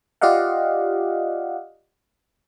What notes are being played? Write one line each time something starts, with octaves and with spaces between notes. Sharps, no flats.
F4 G4 D5 D#5 F5 F#5